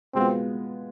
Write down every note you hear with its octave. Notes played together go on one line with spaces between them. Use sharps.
B2 G#3 B3 C4 F4